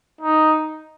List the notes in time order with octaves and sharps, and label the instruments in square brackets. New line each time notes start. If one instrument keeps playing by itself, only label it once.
[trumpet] D#4